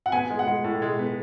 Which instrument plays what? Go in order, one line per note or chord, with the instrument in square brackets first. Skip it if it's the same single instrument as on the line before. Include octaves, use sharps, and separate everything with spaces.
[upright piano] F#5
[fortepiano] B3 [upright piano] G#5
[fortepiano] G#3
[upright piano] F#5
[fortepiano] G#3
A2
G#3
B3